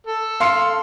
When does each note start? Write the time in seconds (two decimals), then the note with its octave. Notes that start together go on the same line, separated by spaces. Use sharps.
0.07 A4
0.40 F5 C6 C#7